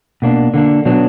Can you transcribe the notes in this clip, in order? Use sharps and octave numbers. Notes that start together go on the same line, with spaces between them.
B2 A#3 D4
D3 A#3 D4
B2 F#3 B3 D4